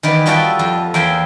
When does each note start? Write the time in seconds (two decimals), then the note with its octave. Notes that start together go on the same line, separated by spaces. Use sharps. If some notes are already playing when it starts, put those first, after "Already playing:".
0.03 D#3 E3 B3 D5
0.26 G3 F4 F#4 A4 E5 G5
0.59 F2
0.94 E2 A#3 E5 G5 G#5 C6